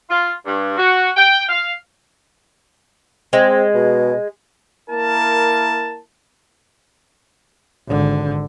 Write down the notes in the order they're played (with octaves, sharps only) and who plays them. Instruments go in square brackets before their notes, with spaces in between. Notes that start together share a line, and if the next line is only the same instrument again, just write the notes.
[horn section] F4
G2
F#4
G5
F5
[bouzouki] G#3 [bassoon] C4
[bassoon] B2
[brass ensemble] A#3 E4 A#4 A5
[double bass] G#1 D3